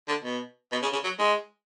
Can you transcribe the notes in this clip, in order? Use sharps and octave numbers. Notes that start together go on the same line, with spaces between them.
D3
B2
B2
C#3
C#3
F#3
G#3